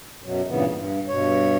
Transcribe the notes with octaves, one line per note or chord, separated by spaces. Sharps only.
F#2 B2 F#3
G2 A#2 C#3 E3 B3
G2
G2 B2 C#5